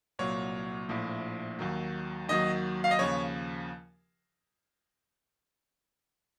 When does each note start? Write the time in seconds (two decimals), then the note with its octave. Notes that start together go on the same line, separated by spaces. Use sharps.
0.19 C2 A#2 F#3 C#5
0.89 A#1 A2 F3
1.59 D#2 D#3 F#3
2.28 D#2 D#3 F#3 D#5
2.84 F5
2.91 D#5
2.99 D#2 C#3 F3 C#5